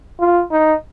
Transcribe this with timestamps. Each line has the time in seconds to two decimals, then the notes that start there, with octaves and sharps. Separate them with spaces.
0.20 F4
0.52 D#4